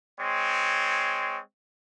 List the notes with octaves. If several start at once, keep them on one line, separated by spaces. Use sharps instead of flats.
G#3 C4 C#5